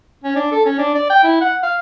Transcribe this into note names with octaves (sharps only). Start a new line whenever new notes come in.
C#4
D4
A4
C#4
D4
D5
G5
E4
F#5
F5